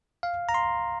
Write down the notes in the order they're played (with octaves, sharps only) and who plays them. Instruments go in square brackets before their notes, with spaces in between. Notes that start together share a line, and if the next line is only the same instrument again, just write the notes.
[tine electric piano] F5
A#5
C6